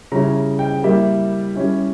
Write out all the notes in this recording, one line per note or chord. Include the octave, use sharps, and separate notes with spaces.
C#3 G3 C#4 E4 A#5
G5
G3 A#3 E4 E5
G3 C#4 E4